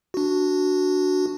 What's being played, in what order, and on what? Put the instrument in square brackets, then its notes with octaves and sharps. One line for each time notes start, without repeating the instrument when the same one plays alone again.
[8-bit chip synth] D4 F#4